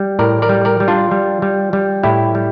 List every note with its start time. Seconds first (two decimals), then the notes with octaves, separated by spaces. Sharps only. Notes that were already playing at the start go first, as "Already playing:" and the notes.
Already playing: G3
0.19 A2 A#4 D5
0.42 A#4 D5
0.49 G3
0.65 A#4 D5
0.80 G3
0.88 D4 F4
1.11 G3
1.42 G3
1.73 G3
2.03 A2 E4 G4
2.35 G3